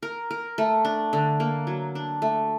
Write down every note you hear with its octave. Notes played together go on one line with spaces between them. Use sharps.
A#4
A#4
A3
D4
D3
A#3
F#3
D4
A3